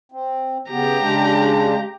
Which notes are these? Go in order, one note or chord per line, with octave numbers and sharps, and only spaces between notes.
C4
C#3 B3 G4 A#5
C#3 G#3 D4